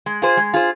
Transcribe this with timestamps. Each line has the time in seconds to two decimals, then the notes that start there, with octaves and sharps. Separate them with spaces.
0.06 G#3
0.22 F4 G#4 C5
0.37 G#3
0.54 F4 G#4 C5